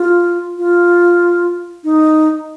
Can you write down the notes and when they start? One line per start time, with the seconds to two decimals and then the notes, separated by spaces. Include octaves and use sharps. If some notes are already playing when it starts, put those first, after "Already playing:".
Already playing: F4
0.58 F4
1.84 D#4